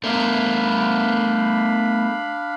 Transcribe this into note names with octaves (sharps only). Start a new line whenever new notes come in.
A3 B3 D4 A#4 F5 B5